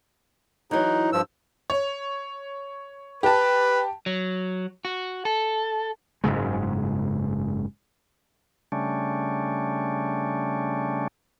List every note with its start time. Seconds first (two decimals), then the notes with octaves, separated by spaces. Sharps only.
0.71 E3 F#3 D#4
1.13 G2 F3 E6
1.70 C#5
3.23 G4 B4 A5
4.06 F#3
4.85 F#4
5.25 A4
6.24 F#1 G#2 C#3 G#3
8.72 C#3 G3 A3 C#4 D4